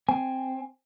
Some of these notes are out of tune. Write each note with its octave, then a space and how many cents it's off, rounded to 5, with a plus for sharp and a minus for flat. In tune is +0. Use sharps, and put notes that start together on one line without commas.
C4 +0 G#5 +0